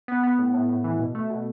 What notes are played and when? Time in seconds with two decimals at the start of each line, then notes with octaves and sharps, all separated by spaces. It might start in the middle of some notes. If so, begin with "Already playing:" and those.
0.08 B3
0.23 B3
0.39 A2
0.54 A2
0.69 A2
0.84 E3
0.99 B2
1.15 A3
1.30 B2